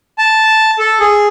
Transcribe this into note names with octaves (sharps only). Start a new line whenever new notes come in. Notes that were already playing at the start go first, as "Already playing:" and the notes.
A5
A4
G#4